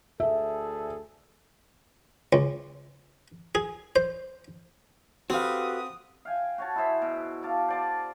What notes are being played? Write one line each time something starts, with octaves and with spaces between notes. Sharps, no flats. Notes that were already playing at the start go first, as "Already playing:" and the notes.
D2 G#4 A4 E5
C#2
G#4
C5
C4 F#4 G4 A4 B4 F5 D#6
F5 G5 G#5
F#4 C#5 A5
E4 G#4 C5 E5
B2
F5 A5 D6
C5 D5 A5